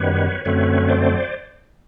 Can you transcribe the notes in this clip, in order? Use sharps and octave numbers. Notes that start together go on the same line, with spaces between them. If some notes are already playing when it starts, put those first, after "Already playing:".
Already playing: F#2 D#3 G3 B3 B4 C#5
F#2 D3 F#3 A3 C4 B4 C#5
C5 D5